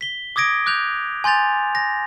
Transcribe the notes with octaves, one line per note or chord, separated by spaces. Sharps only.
B6 G7
D6 D#6 G#6 A#6 D7
D6 F#6 G6 F7
G#5 C6 G6 A6 F7
A#6